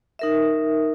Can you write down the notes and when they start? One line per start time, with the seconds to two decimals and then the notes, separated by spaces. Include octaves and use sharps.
0.19 D#4 A#4 E5